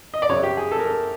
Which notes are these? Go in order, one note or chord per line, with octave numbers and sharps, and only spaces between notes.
D#5
D5
F#2 C#3 F#3 C#5
G4
G#4
A4
A#4
A4